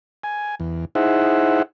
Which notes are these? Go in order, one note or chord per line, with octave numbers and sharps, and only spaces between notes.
G#5
E2
D#4 E4 G#4 C5 E5 F#5